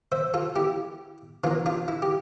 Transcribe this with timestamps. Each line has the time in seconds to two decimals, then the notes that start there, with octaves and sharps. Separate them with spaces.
0.12 C5 E5
0.34 F4 A4
0.56 E4 G4
1.44 E3 A#3 D4 F4
1.66 D4 F4
1.88 E4
2.02 G4